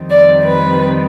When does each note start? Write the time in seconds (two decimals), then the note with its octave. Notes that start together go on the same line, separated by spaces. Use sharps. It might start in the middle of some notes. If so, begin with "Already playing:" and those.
Already playing: F2 D#3 G3 C4
0.10 D5
0.43 B4